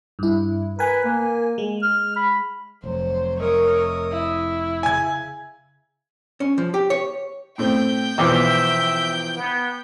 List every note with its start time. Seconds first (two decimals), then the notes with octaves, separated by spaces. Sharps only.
0.19 G2 E4
0.79 A#4 B4 G#5
1.04 A#3
1.58 G#3
1.82 F6
2.16 B5
2.84 F1 F#3 C5
3.40 A#4 C#5 D#5 E5 D#6
4.12 E4
4.83 C#3 G#5 G#6
6.40 C#4
6.58 F3
6.74 G4
6.90 C#5
7.58 A2 A3 C4 G5 G6
8.18 B1 E2 E3 F3 E5 D6
9.36 B3